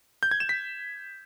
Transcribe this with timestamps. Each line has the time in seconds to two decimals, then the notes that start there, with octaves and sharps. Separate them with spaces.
0.23 G6
0.31 G#6
0.40 E7
0.49 B6